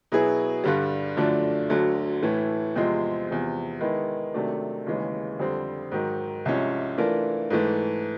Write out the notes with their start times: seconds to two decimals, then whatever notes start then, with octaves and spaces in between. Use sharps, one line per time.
0.12 B2 F#3 B3 E4 G#4
0.64 G2 D3 G3
1.17 F#2 D3 F3 A3 D4
1.70 D2 D3 F#3
2.23 A2 E3 A3
2.76 E2 C3 F3 G#3 C4
3.29 E2 C3 F3
3.81 D#3 G#3 B3 E4
4.34 C3 D#3 F#3 A3 D4
4.86 D#2 C#3 E3 G#3
5.39 F2 D3 G3 C4
5.91 G#2 D#3 F#3
6.45 C2 C3 F3 G#3 C#4
6.98 E3 A3 D4 F4 A#4
7.50 G#2 E3 A3